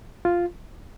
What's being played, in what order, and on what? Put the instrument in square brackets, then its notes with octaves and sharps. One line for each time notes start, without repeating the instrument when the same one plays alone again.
[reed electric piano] F4